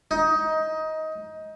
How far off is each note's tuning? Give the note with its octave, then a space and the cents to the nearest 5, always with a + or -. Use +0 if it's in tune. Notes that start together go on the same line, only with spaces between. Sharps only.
D#4 +20